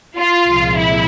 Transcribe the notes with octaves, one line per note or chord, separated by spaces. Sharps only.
F4
C2 A#2 F3 G#3
E4